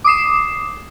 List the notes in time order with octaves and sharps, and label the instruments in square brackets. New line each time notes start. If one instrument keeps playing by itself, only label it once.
[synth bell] D6 D#6 C7 E7